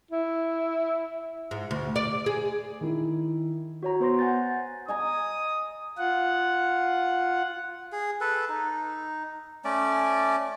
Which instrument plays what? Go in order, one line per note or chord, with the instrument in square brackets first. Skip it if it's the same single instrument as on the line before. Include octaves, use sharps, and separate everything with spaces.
[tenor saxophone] E4
[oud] G#2
D2
D5
G#4
[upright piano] D#3 E4
[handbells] F#4 C#5 A#5
B3 C5 C6 A#6
F#5 G#5 G6 A6
[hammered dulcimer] D#5 G#5 A#5 [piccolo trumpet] D#6
[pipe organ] F4 F#5
[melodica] G#4
A4 B4
D#4
A3 C#4 D5